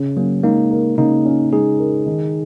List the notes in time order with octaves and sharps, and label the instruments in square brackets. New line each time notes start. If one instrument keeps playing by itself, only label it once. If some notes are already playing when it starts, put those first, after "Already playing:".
Already playing: [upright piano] C#3
[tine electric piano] F#3 A#3 [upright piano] C#4
[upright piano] G#3 [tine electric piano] A#3 D#4
[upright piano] A#4
[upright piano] C#3 [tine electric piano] A#3 D#4
[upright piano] C#4
[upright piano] G#3 [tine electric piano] D#4 G#4
[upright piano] A#4
D#3